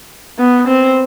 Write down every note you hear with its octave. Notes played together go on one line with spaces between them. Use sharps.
B3
C4